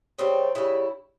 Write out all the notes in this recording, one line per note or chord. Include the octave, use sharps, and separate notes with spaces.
C#3 G3 C4
C#3 G3 E4